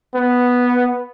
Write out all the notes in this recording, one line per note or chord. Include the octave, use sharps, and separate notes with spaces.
B3